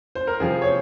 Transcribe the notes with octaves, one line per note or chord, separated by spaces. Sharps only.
C5
A#4
C3 F3 C4 G#4
C#5
C5